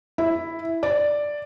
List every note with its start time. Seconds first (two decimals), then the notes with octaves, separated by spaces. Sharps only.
0.18 E4
0.83 D5